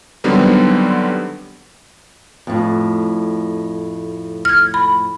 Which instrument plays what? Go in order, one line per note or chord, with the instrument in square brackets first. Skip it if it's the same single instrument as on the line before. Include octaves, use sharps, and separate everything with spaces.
[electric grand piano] D3 D#3 F#3 G3 B3 C4
[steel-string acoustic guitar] F2 A2
[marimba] F6 G#6
B5